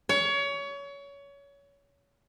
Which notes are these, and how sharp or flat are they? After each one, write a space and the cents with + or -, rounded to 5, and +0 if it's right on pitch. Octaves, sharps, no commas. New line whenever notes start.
C#5 +25